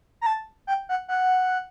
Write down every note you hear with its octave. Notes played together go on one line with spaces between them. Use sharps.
A#5
A5
G5
F#5
F#5